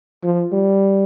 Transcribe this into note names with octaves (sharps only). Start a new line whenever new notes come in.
F3
G3